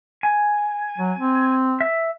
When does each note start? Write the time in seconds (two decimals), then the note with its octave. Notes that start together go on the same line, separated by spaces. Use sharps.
0.23 G#5
0.98 F#3
1.18 C4
1.81 E5